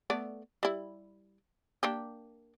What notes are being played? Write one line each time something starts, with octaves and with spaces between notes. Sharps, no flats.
A3 B3 D5
G3 E4
A#3 D4 G4